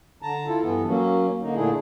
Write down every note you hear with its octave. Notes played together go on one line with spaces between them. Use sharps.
D3 A5 A#5
E4 F4 A4
G2 E3 B3 A4
F#3 A#3 C#4
D3 A#3 D#4
A#2 D3 A3 D4 E4 G#4